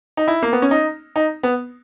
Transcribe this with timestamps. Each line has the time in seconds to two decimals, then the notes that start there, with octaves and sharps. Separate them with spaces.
0.17 D#4
0.28 E4
0.43 A#3
0.53 B3
0.62 C#4
0.71 D#4
1.16 D#4
1.43 B3